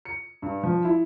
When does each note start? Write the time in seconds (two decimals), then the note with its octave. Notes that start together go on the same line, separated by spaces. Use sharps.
0.05 C#7
0.42 G2
0.63 F3
0.85 E4